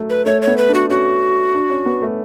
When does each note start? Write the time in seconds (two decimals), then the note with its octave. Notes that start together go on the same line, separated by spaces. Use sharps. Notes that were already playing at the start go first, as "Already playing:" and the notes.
Already playing: F#3 A3
0.10 B4
0.26 A3 C#5
0.42 C#5
0.47 B3
0.58 B4
0.68 D4
0.74 F#4
0.90 C#4 F#4
1.54 D4
1.70 C#4
1.86 B3
2.02 A3